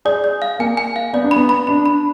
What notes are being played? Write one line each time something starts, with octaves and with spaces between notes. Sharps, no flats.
G#4 D5
D5
F5
A#3 G#5
G#5
F5
B3 D5
D4
B5
B3
B5
D4 B5
B5